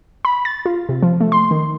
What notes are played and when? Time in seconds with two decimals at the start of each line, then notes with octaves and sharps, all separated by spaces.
0.25 B5
0.45 A6
0.66 F4
0.89 C3
1.03 F3
1.21 A3
1.32 C6
1.51 D#3